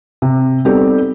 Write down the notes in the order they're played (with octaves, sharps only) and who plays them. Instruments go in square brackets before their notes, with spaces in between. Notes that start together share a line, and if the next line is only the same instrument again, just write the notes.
[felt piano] C3
G3 B3 C4 D#4 G4 A4